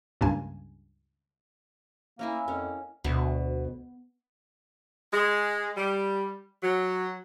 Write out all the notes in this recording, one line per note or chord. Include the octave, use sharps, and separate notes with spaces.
C#2 G2 A#3 G#5
A#3 C#4 E4 G#5
F2 A#3 C#4
D2 B2
G#3
G3
F#3